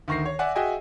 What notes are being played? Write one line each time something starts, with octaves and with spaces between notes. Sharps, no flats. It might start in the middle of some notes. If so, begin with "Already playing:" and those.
D2 D#3 C#6 A#6 C7
C#5
D5 E5 F#5 G#5
F#4 G#4 D#5 E5 G5 G#5